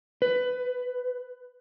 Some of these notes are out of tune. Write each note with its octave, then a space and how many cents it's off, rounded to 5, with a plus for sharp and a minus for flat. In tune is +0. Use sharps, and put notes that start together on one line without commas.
B4 +20